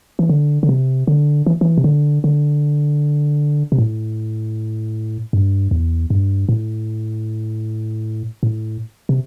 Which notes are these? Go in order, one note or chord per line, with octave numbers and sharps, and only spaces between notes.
E3
D3
D3
C3
D3
E3
E3
C3
D3
D3
C3
A2
G2
E2
G2
A2
A2
C3